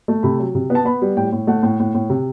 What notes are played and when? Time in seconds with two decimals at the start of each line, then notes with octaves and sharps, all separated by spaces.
0.08 A3
0.23 C3 B5
0.39 F#3
0.55 C3
0.70 B3
0.75 A5
0.85 B3 B5
1.02 G3
1.17 A2 G5
1.32 A2
1.47 A3 F#5
1.63 A2
1.80 A2
1.95 A2
2.10 C3